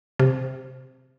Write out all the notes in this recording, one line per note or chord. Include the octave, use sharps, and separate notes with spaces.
C3